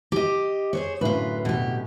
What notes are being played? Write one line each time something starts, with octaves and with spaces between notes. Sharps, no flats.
G4 D#5
G#4 C5 C#5
F#2 A2 D3 F4 B4
B2 G4